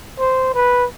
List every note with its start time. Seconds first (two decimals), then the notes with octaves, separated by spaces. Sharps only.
0.19 C5
0.55 B4